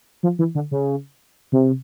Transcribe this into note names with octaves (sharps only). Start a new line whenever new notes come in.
F3
E3
D3
C#3
C3